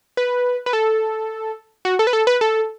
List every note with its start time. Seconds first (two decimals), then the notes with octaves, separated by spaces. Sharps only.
0.17 B4
0.66 B4
0.73 A4
1.85 F#4
1.99 A4
2.07 B4
2.13 A4
2.27 B4
2.41 A4